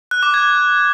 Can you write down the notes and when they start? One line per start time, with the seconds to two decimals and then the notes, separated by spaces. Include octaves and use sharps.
0.11 F#6
0.23 D6
0.34 G#6